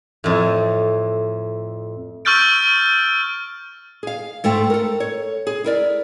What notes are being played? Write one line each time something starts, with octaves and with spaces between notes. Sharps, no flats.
F2 A2
C#6 E6 F6 G6 A6 D7
G#4 F5
G#2 A3 F4 G5
A4 A#4
C#5
G#4
E4 A#4 D5